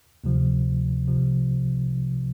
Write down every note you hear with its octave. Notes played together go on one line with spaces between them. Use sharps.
D2 C3 F3
C2 C3 F3